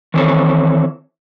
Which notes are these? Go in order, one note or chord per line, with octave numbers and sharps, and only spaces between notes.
D#3 E3 C4 A4 C#5